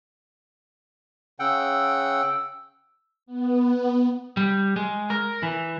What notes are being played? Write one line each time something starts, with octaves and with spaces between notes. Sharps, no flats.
C#3 F#5 G5 E6
B3
G3
G#3
A#4
E3